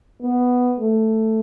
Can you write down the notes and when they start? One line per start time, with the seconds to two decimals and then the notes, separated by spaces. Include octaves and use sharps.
0.21 B3
0.80 A3